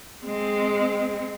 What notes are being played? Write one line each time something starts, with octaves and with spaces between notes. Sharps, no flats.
G#3 C4